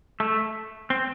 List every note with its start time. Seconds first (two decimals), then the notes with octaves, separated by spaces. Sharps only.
0.20 A3
0.90 C4